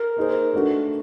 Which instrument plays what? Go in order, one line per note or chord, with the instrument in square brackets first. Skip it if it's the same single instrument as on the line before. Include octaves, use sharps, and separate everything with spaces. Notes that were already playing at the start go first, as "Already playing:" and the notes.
Already playing: [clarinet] A#4
[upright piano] A#3 D#4 G#4 C5
A3 D4 F#4 B4